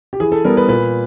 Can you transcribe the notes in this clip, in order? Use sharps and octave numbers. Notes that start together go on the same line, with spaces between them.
G4
E3 G#4
A4
G3 B3 A#4
B4
A#2 B4